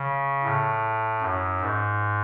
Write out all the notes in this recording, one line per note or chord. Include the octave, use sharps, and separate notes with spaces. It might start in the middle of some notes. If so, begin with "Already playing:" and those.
Already playing: C#3
A2
F#2
G#2